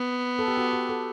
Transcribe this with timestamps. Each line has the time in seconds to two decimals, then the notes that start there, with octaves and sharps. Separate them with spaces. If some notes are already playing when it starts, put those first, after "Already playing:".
Already playing: B3
0.39 A4
0.48 G4
0.57 F#4
0.73 G4
0.89 A4